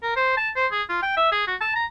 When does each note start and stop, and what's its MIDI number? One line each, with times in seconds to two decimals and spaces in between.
0.03 0.12 70
0.16 0.37 72
0.37 0.49 81
0.56 0.67 72
0.72 0.82 68
0.89 0.98 65
1.02 1.17 79
1.17 1.27 76
1.32 1.45 68
1.47 1.55 66
1.61 1.72 81
1.75 1.85 82